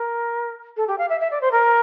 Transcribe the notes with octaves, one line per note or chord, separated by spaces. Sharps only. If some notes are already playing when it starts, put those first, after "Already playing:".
Already playing: A#4
A4
G4
F5
E5
E5
D5
C5
A#4